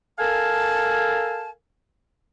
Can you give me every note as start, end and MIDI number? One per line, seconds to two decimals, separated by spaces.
0.19 1.50 69
0.19 1.50 70
0.19 1.50 77
0.19 1.50 80
0.19 1.50 81